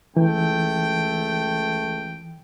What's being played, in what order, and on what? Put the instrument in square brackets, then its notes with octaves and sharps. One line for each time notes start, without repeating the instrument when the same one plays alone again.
[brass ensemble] C#2 A3 G5 [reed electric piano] E3